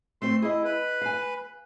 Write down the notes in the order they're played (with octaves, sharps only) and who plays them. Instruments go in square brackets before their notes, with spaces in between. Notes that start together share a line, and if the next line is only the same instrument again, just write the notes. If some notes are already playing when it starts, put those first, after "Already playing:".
[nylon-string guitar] A3 C4 C5 [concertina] C6
[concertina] E4 [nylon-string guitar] G#4 D#5
[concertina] B4
[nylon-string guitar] F5 G#5